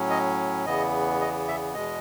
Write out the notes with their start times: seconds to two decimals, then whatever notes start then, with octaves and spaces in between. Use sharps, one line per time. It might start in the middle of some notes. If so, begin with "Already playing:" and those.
Already playing: A2 F#3 C#4
0.10 D#5
0.66 E2 C#3 E3 B3 D#5
1.21 D#5
1.48 E5
1.75 E2 B2 G#3 D#5